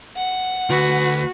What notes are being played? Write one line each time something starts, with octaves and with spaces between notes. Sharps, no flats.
F#5
D2 F#4 B4